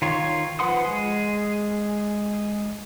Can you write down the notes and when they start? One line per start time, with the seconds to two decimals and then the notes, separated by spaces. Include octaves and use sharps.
0.02 D#3 F4 C#5
0.59 F3 B4 F#5 C6 D#6
0.85 G#3 G#4